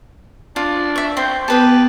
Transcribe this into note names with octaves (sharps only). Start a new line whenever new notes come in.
D4 F4
E5 C#6
C4 C5 C6
B3 G4 B4 A5 D#6